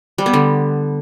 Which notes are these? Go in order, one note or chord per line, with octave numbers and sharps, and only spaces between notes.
G3
B3
D3